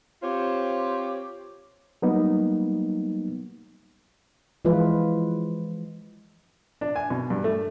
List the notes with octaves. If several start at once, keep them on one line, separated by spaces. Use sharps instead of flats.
C4 F4 G4 C5 C#5
F#3 G3 A#3 B3 D#4
E3 F3 G#3 F4 B4
D4
G#5
B2
G2
A3